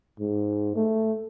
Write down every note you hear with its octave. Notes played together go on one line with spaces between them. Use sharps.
G#2
A3